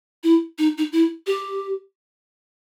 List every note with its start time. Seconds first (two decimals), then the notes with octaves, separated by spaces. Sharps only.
0.24 E4
0.58 D#4
0.78 D#4
0.92 E4
1.27 G4